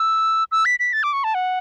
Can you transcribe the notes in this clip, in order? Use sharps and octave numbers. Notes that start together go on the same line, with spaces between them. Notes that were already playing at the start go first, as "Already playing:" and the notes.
Already playing: E6
E6
B6
B6
A6
D6
C#6
A5
F#5